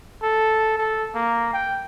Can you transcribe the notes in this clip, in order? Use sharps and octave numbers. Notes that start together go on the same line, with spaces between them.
A4
A4
A#3
G5